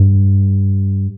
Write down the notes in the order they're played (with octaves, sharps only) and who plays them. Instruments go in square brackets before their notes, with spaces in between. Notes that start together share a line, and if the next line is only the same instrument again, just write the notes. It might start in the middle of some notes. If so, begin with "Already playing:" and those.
Already playing: [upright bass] G2